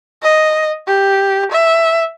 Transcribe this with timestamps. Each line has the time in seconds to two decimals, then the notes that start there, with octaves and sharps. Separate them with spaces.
0.23 D#5
0.88 G4
1.52 E5